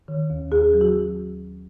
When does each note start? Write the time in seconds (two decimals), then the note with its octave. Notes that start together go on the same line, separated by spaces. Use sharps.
0.08 D#3
0.30 D#2
0.52 D#2 G#4
0.74 F#3
0.81 F#4